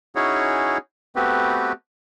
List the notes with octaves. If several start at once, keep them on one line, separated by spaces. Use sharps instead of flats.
C#4 D#4 E4 F#4 G#4 C#5
A3 B3 C4 F#4 G4 B4